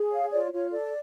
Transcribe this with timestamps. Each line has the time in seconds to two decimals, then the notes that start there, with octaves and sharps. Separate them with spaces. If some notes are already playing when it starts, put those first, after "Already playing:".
Already playing: G#4
0.12 C#5 F5
0.32 F4 D5
0.52 F4 C#5
0.72 A4 D5